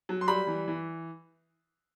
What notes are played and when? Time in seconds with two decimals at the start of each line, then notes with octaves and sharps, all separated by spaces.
0.09 F#3
0.21 C6
0.28 G3 B5
0.47 E3
0.68 E3